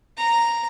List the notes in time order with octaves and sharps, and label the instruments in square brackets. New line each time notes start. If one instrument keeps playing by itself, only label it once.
[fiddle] A#5